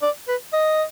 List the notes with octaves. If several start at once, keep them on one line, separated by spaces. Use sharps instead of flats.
D5
B4
D#5